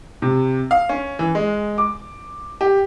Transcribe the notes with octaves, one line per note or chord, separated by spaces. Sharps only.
C3
F5
C#4
E3
G#3
D6
G4